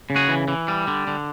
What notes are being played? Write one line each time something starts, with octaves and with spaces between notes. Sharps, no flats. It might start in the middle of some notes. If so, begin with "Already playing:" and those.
C#3
F#4 G#4
E3
E3
G3
D3
D3